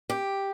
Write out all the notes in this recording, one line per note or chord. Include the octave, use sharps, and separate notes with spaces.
G4